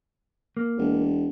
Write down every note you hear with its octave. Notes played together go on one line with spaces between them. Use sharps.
A#3
E1